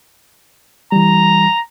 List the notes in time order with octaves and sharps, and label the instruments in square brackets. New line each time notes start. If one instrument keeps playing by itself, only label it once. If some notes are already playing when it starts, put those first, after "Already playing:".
[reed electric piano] E3 G3 [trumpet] A#5